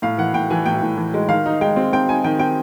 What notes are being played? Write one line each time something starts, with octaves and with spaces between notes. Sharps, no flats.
A2 F5
E3 F#5
A2 G5
E3 G#5
A2 G5
A2
E3
G#3
D#3 F5
D#4
G#3 G5
C4
C4 G5
D#4 G#5
D#3 G5
C4 G5